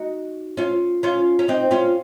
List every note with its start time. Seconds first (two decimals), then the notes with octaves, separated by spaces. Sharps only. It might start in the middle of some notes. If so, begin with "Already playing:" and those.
Already playing: D#4 F#4
0.57 C#4 F4
1.03 C#4 F4
1.39 C#4
1.48 C4 D#4
1.71 C#4 F4